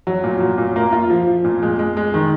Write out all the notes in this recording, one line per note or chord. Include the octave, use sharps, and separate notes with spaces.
F#3
A#2
F#3
A#2
A#3
F4
F3
F3
A#2
G#3
G#3
G#3
D#3